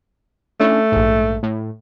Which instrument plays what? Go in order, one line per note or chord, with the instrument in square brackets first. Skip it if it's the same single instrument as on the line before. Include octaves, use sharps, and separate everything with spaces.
[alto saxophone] A3 [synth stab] C#4 D4 E4
[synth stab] A#1 G#2
A2